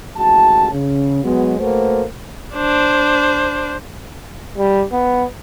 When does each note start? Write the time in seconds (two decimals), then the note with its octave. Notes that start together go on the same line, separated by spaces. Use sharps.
0.17 A1 D#2 G#3 F#4 A5
0.72 C#3
1.24 F#3 G#3 B3 F#4
1.60 A3 A#3 F#4 A4 B4 C5
2.55 D4 C5
4.57 G3
4.92 B3